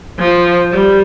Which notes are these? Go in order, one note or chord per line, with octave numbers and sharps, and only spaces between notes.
F3
G3